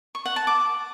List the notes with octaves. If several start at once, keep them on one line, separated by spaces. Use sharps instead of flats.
C#6
F#5
A5
D6